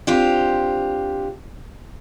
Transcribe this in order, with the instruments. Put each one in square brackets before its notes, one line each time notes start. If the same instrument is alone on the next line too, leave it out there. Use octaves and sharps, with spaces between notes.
[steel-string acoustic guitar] C4 D4 F4 G4 C5